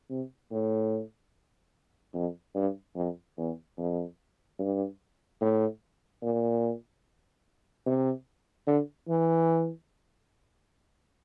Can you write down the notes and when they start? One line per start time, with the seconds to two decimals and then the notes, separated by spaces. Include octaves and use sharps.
0.10 C3
0.51 A2
2.14 F2
2.55 G2
2.96 F2
3.37 E2
3.78 F2
4.59 G2
5.41 A2
6.22 A#2
7.86 C3
8.67 D3
9.09 E3